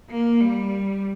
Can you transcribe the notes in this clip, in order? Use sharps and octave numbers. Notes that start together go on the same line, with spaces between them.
A#3
G3